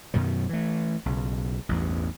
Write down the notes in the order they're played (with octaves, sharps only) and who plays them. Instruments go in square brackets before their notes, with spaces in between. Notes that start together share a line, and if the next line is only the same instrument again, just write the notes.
[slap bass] F#2 B2 D#3 F#3
E3 A3
B1 C#3
A1 E2 G2